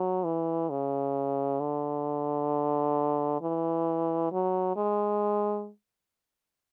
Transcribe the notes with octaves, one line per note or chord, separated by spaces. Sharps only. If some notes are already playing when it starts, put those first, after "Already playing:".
Already playing: F#3
E3
C#3
D3
E3
F#3
G#3